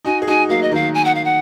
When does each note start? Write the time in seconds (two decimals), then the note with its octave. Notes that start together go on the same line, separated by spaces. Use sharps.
0.05 D#4 F#4 G#5
0.22 G#4
0.27 D#4 F#4 G#5
0.49 F#3 A#3 F5
0.62 D#5
0.72 D#3 F#3 F5
0.94 G#5
1.04 F#5
1.14 F5
1.24 F#5